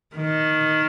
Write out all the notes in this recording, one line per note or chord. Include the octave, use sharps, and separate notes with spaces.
D#3